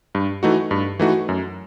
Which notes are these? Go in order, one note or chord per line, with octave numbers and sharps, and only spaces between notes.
G2
E3 A3 D#4 F#4
G2
E3 A3 D#4 F#4
F#2